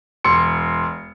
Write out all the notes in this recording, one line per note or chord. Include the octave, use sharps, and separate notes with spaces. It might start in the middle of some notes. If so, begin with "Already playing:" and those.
E1 C6 C#7